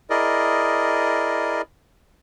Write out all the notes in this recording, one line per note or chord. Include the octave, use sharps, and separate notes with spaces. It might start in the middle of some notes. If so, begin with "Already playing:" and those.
E4 G#4 A#4 D5 D#5